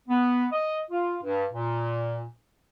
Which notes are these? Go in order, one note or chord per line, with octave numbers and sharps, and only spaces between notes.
B3
D#5
F4
G2
A#2